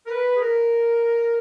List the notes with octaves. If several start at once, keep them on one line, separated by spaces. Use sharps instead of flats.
A#4
B4
G#4
A#4